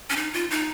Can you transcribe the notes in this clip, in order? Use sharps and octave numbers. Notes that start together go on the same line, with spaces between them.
C#4
D#4
F4
D#4